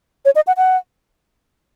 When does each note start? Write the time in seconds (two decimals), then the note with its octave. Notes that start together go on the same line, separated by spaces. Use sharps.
0.25 C#5
0.36 D#5
0.47 F#5
0.57 F#5